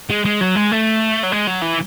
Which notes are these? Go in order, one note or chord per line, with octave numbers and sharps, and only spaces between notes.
G#3
G#3
F#3
G#3
A3
F#3
G#3
F#3
E3